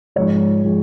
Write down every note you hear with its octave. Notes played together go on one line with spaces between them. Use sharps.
G#2 F3 G#3 C#5
F3 G#3